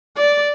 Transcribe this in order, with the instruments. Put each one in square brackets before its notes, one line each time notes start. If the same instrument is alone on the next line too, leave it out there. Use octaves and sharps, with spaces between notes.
[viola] D5